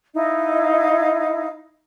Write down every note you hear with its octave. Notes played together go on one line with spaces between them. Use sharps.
D#4 E4 D#5 F5